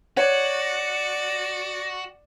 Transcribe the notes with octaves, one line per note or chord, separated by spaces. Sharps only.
F#4 C#5 D5 F#5